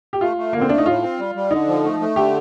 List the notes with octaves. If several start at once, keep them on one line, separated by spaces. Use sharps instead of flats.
G4
A3 F4
A3
D3 A#3
C4
A3 D4
D#4
A2 F4
C4
G3
G3
D3 D#4
F3
A3
A3
D3 G4